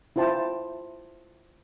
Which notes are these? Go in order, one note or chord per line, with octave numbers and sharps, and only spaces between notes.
E4 F4 C5 G5 A5